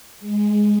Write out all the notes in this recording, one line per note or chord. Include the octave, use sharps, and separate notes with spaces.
G#3